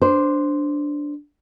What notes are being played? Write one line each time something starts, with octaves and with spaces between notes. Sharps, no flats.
D4 C5